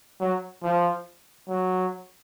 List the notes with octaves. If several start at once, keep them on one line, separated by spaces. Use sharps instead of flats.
F#3
F3
F#3